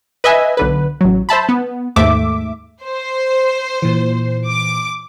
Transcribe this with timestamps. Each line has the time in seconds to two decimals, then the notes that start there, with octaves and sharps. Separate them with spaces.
0.24 B4 D#5 E5 G#5
0.57 B1 D3 B4
1.01 A1 F#3
1.29 C5 E5 A5 B5
1.49 B3
1.96 D#2 G#2 A3 E5 D6
2.82 C5
3.82 A#2 E3
4.49 D6